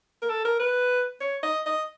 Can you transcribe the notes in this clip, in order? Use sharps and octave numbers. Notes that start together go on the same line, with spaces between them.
A#4
A4
A#4
B4
C#5
D#5
D#5